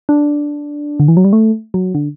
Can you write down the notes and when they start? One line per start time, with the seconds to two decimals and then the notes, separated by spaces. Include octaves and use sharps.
0.09 D4
1.00 D3
1.08 E3
1.17 F#3
1.24 G3
1.33 A3
1.74 F#3
1.95 D3